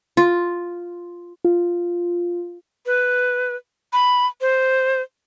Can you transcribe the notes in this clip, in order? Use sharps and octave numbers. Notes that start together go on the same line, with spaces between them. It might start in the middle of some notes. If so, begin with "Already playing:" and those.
F4
F4
B4
B5
C5